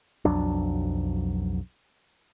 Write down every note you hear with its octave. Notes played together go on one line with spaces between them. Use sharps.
B1 F2 F#3 D4